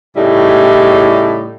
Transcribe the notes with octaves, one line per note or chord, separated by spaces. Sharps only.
A2 C#3 G3 D#4 E4